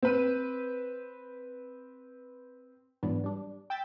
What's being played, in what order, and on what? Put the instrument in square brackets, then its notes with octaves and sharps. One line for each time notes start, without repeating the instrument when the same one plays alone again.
[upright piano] C4 B4 D#7
[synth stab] G#2 E3 F#3 B3 D4
G3 D4
G5 E6 G6 A6 B6